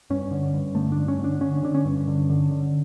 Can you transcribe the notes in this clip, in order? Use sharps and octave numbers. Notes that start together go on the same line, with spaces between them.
G2 C#4
D3
G2
D3 A3
G2 D4
C#4
D3
D4
D3 C#4
D3 D4
C#4
G2
D3
D3
D3